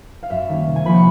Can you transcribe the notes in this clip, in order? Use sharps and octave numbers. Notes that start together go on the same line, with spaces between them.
F5
F#2 E5
D#3 G3 A#3 C#4
C3
G#5
F3 A#3 C#4 B5
F#5